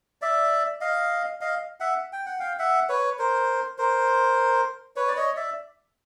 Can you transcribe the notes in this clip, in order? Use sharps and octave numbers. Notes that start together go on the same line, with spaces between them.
D5 E5
D#5 F5
D#5 F5
E5 F#5
G5
F#5
F5 G5
E5 F#5
B4 C#5
A#4 C5
A#4 C5
B4 C#5
D5
C#5 D#5
D5 E5